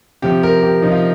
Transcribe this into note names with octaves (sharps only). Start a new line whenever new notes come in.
C3 F3 G4
A#4
G4
C3 F3 D#4
F4